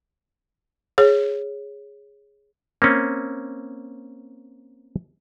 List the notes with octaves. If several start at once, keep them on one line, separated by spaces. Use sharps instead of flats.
G#4 C#5
A#3 C4 C#4